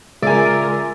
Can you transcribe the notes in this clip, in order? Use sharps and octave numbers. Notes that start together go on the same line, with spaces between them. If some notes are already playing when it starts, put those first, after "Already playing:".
C#3 G#3 F4 A#4 D5 E5 G#5